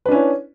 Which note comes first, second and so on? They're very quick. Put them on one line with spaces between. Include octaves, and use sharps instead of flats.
B4 D4 C#4 E4